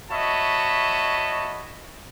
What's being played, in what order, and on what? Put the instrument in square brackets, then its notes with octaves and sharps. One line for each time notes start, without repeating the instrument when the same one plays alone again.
[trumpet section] F#4 C#5 D#5 E5 A5 B5